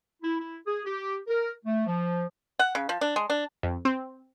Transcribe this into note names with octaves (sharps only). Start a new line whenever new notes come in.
E4
E4
G#4
G4
A#4
A3
F3
F#5
C#3
F3
D4
G#3
D4
F2
C4